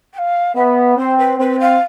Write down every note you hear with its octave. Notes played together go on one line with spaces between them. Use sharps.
G5
F5
B3 E5
C4 C5
B4
C4 B4
F5